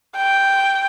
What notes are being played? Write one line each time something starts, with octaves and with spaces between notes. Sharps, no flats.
G5